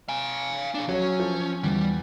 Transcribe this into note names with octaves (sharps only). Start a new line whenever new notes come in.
F5 G#5
D4 G#4
F#3 C#4 C#5
F3
E2 G3